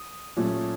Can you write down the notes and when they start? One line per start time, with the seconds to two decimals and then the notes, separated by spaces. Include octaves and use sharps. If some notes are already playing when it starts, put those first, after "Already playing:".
Already playing: D#6
0.36 A#2 F#3 A3 C#4